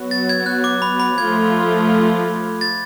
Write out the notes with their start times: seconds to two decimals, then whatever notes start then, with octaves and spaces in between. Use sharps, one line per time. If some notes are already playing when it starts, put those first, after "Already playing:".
Already playing: F#3 B3 F#4 C#5
0.11 A6
0.29 G#6
0.46 F#6
0.64 D6
0.82 B5
1.00 B5
1.17 F3 A3 F4 G#6
2.61 A6